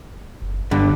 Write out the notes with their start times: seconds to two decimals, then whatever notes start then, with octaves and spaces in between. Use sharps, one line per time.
0.42 F#1
0.71 G#1 G2 D3